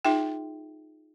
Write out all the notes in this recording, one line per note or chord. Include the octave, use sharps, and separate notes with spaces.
D#4 F4 G#4 E5 G5